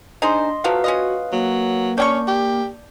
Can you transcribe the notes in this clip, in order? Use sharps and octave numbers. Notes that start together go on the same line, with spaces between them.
D4 D#4 G#4 C5 D#5 C6
F3 F#3 A3 F#4 B4 F5
C#4 F4 D#5
F#3 A#3
C#4 D4 G5 C#6 G6
G4